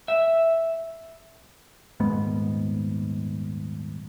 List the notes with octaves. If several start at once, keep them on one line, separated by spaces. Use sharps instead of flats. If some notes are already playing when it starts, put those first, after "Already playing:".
E5
D#1 G#2 B3